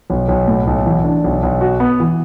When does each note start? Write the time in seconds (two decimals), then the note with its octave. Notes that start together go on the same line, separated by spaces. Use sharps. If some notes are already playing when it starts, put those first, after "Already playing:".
0.10 B1
0.29 B1
0.48 A2
0.67 B1
0.86 E3
1.04 D4
1.24 B1
1.43 B1
1.61 F#4
1.80 B3
2.00 E3